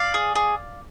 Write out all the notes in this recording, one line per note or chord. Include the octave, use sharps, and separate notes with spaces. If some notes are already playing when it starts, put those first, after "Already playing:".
Already playing: D5 F5
G#4
G#4